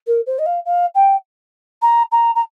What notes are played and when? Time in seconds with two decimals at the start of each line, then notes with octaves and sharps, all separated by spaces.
0.07 A#4
0.26 C5
0.39 D#5
0.46 F5
0.65 F5
0.95 G5
1.82 A#5
2.12 A#5
2.35 A#5